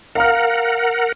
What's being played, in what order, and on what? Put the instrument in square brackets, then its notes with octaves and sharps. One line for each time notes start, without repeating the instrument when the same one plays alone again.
[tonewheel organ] A#4 F#5 [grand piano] F5 A#5 F6